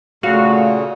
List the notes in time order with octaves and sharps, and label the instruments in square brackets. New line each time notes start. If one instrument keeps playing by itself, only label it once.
[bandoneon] A#2 C#3 [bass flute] A3 [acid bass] F#4 [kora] F5